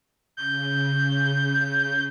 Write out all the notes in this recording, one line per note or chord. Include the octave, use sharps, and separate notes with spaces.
C#3 G6